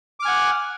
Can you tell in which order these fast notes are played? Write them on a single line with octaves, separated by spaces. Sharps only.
D6 F6 G#5 F#5